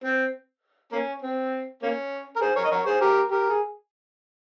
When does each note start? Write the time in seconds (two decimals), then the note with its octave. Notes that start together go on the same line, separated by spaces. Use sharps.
0.04 C4
0.92 A#3 C#4
1.22 C4
1.82 A#3 C#4
2.36 A#4
2.41 G#4 C5
2.56 A#4 C#5
2.64 D#5
2.71 A#4 C#5
2.86 G#4 C5
3.01 G4 A#4
3.31 G4 A#4
3.50 G#4